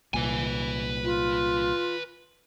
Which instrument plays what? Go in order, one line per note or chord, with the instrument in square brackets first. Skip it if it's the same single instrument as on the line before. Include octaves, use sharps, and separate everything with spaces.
[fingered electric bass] C2 A#2 [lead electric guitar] B4 G#5
[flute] F4